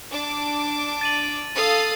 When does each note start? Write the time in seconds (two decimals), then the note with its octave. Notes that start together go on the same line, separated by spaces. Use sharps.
0.11 D4 D6
1.01 A6 D#7 F#7
1.55 A4 F5 D#6